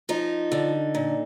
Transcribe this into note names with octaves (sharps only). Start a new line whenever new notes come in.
F3 D#4
D3
A#2